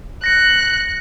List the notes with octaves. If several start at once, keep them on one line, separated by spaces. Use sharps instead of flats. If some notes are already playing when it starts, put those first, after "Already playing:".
F#6 A#6 C#7